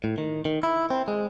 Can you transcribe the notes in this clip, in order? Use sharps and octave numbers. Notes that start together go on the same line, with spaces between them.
A2
D#3
D#3
E4
C4
G#3